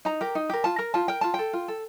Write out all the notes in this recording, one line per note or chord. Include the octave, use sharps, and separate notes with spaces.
D#4 A#5
G4 A#4
D#4
G4 A#4
F4 A5
A#4 A#5
F4 A5
A#4 G5
F4 A5
A4 G5
F4
A4